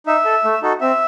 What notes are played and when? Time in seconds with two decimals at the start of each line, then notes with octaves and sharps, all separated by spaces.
0.06 D#4 E5
0.25 A4
0.45 A3
0.62 D#4 F#4 A4
0.81 C4 E5